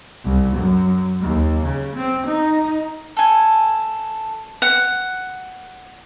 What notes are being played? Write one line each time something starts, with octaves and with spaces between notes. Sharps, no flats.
C2
F#2
D#2
C#3
C4
D#4
A4 G#5
F#5